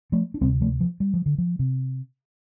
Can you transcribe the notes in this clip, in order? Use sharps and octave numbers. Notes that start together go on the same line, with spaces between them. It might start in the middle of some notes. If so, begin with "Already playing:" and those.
F3 A3
D4
D2 C3 G3 C4
F3 A3
F3
G3
F3
D3
F3
C3